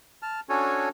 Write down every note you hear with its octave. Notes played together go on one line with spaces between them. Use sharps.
A5 F6
C#4 D4 F#4 A4 C#5 G#5